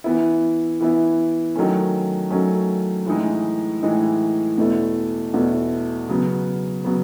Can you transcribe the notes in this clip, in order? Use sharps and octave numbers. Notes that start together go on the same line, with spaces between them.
E3 B3 E4
E3 B3 E4
D#3 F#3 A3 C#4
D#3 F#3 A3 C#4
A2 E3 G#3 D#4
A2 E3 G#3 D#4
E2 B2 A3 E4
E2 B2 A3 E4
C#3 F#3 B3
C#3 F#3 B3